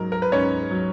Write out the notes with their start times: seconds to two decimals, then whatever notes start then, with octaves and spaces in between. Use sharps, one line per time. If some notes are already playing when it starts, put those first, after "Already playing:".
Already playing: G#2 F#3 A#4
0.12 A#4
0.22 B4
0.32 G#2 C#4 C#5
0.71 F#3